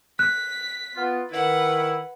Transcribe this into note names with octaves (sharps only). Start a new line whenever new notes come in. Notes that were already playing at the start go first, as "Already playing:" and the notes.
F#6 B6
B3 F4
D#3 E4 B4 F#5